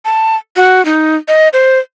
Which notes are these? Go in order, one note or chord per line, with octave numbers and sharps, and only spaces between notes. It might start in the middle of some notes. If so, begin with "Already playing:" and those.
A5
F#4
D#4
D#5
C5